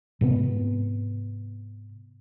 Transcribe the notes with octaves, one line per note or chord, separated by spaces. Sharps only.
G#2 C3 B3